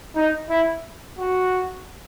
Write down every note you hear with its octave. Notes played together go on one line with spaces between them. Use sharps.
D#4
E4
F#4